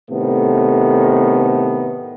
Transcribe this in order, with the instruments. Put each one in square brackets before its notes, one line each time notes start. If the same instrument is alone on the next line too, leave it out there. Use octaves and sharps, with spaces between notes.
[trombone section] A2 C3 D#3 A3 B3